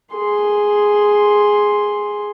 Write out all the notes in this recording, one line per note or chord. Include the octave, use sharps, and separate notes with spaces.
G#4 C6